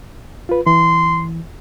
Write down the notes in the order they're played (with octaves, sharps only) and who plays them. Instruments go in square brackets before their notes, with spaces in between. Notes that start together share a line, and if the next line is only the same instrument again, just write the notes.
[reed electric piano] F4 B4
[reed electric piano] E3 [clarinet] C6